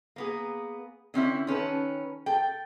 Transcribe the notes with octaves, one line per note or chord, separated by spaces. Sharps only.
A#3 B3 G#4
D3 C4 C#4 E4
D#3 C#4 A4 B4
A4 G5